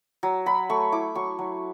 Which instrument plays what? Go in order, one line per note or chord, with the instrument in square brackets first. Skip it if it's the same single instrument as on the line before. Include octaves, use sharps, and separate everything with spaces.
[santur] F#3
F#3 B5
A3 C#6
E4 D6
F#3 C#6
F#3